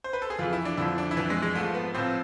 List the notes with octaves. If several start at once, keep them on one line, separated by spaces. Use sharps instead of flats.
C5
B4
A4
G#4
F2 E3 F4
E4
D4
F2 D3 F3 E4
D4
E4
F2 E3 D4
G#3
G#3
G#2 F3 A3
B3
A2 F3 C4